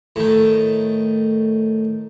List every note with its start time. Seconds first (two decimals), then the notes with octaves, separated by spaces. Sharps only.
0.16 A2 D#3